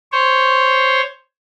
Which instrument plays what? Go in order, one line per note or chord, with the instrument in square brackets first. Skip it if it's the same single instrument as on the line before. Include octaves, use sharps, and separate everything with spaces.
[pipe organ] C5 C#5